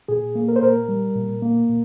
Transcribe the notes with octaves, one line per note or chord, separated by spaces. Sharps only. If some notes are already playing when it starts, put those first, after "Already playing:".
A#2 G#4
A#3
A#4
C5
A#2 A#4
G3
A#2
A#3
A#2